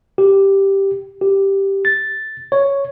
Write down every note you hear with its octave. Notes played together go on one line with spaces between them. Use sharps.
G4
G4
A6
C#5